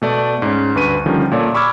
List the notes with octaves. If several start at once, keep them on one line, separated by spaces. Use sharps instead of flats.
B2 A3 D5
G#2 C#4
D2 G2 B4 C#6 D#7
D3 D#3 F3 G3 C#4
A#2 A3 C#5 D5
B5 C#6 D6 E6 F6 G#6